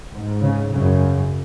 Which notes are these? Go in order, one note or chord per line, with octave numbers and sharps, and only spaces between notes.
G#2
C#3
F#2 C#3